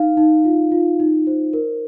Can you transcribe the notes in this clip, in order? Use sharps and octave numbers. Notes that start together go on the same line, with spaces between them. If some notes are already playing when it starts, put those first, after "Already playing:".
Already playing: D#4 F5
D#4
F4
F4
D#4
C5
A#4